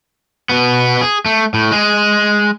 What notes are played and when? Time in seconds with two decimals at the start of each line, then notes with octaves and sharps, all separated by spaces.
0.49 B2 B3
1.01 G#4
1.26 A3
1.54 A2
1.71 G#3 G#4